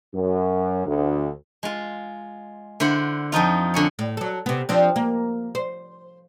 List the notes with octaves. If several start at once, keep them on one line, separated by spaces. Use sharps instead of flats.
F#2
D2
G#3 F4
D3 E4 C5 F#5
F2 F3 D#4 F4
D3 C#4 C#5
A2
F#3 A4
C3 B3
F3 C4 D4
A#3
C5